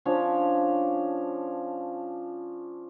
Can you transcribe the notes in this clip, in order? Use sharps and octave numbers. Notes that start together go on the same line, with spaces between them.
F3 C#4 D4 C#5